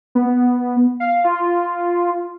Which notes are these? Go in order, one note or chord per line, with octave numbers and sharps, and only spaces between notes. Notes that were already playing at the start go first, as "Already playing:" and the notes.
B3
F5
F4